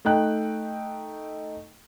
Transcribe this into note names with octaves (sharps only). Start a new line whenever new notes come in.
A3 D#4 G5 F#6